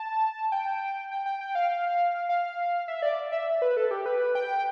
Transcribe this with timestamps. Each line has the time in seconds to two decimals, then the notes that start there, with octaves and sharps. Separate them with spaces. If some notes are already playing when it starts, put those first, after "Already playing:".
Already playing: A5
0.52 G5
1.11 G5
1.26 G5
1.41 G5
1.55 F5
2.29 F5
2.88 E5
3.02 D5
3.32 E5
3.62 B4
3.77 A4
3.91 G4
4.06 B4
4.35 G5